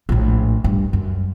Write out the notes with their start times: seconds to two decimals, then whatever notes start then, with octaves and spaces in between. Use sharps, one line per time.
0.09 A#1 A2
0.64 G2
0.93 F#2